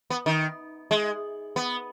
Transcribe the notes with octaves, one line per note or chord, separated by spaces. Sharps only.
B3
D#3
G#3
B3